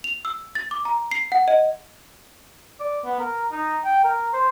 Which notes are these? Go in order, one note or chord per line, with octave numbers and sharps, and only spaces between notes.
F7
E6
A6
D6
A#5
C7
F#5
D#5
D5
B3
A#4
D#4
G5
A#4
C5